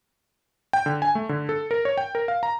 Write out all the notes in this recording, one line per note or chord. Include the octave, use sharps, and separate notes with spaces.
G5
D3
G#5
A3
D3
A4
A#4
C#5
G5
A#4
F5
A#5